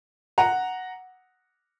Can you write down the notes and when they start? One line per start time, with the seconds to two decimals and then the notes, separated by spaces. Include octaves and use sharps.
0.38 F#5 A#5